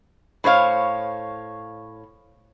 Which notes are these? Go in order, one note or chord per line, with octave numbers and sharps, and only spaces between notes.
A2 C5 C#5 F5